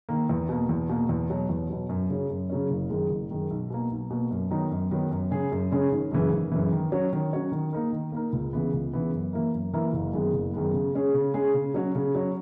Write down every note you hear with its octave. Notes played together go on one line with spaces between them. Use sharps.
D#3 A#3
E2
B2 A#3
E2
B2 A#3
E2
B2 F#3
E2
B2 F#3
F#2
C#3 F#3 C#4
F#2
C#3 F#3 C#4
F#1
F#2 D#3 G#3
F#1
F#2 D#3 G#3
B1
B2 A#3
B1
B2 A#3
F#2
D#3 F#3 B3 D#4
F#2
D#3 F#3 B3 D#4
F#2
C#3 G#3 C#4 G#4
F#2
C#3 G#3 C#4 G#4
G#1
F#2 C#3 E3
G#1
F#2 C#3 E3
D#3
F#3 C#4 F#4 C#5
D#3
F#3 C#4 F#4 C#5
D#3
A#3 D#4 A#4
D#3
A#3 D#4 A#4
C#2
C#3 E3 B3
C#2
C#3 E3 B3
F#2
E3 A#3 E4 A#4
F#2
E3 A#3 E4 A#4
F#1
F#2 D#3 G#3 B3
F#1
F#2 D#3 G#3 B3
C#3
G#3 C#4 G#4
C#3
G#3 C#4 G#4
C#3
F#3 C#4 F#4
C#3
F#3 C#4 F#4